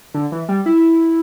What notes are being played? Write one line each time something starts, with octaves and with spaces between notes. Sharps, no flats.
D3
E3
G3
E4